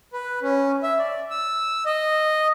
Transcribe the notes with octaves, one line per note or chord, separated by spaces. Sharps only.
B4
C#4
E5
D5
E6
D#5